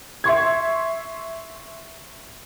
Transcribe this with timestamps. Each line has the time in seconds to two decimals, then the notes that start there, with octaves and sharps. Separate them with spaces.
0.24 E5 C6 C#6 G#6